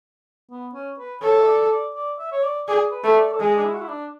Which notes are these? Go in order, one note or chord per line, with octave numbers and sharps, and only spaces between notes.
B3
C#4
B4
A4 C#5
E5
D5
D5
D5
E5
C#5
D5
G#4 D5
B4
A3
D5
A4
G#3 G#4
D4
E4
F#4
E4
D4